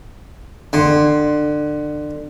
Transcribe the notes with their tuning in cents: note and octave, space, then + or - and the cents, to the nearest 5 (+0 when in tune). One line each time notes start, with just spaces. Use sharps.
D3 +25